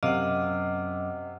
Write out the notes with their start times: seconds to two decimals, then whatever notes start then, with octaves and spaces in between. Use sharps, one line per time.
0.03 F#2 C3 D#5 F5 F#5 D6 F6